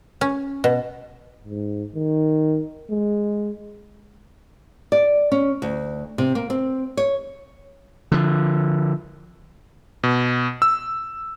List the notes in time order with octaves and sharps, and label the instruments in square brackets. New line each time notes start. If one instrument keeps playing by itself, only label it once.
[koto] C#4
B2
[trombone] G#2
D#3
G#3
[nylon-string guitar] D5
C#4
D2
C3
A#3
C4
C#5
[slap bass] D3 F3
[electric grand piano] B2
E6